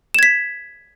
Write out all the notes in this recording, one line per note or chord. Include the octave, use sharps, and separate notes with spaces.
G#6 B6 E7